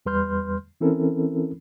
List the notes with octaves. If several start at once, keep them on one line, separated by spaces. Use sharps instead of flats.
E2 G3 B4 C6 F6 G6
E3 C4 C#4 E4 A4 A#4